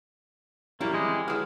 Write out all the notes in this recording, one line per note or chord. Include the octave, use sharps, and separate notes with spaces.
F#3 G3 A#3 C#4 E4
E3 G#3 C4 G4
E3 F#3 G#3 F6